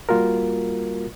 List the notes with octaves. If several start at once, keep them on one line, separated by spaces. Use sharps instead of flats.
G3 A#3 F4 F#4 A#4